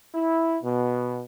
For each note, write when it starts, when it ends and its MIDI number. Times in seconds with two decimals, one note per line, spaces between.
0.14 0.58 64
0.64 1.20 47